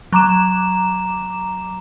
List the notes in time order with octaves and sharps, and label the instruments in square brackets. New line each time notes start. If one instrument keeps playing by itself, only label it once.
[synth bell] F#3 A#5 D6 E7